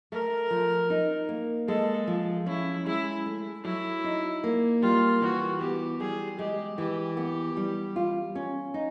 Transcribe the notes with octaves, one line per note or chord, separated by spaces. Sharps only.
A3 A#4
F3
D#4
A#3
G#3 A4
F3
C#4 E4
G#3 E4
A3
F#3 E4
D#4
A#3
G3 F4
E3 F#4
B3 G4
G3 G#4
G#3 G4
E3 G4
B3
G3
F4
C#4
D#4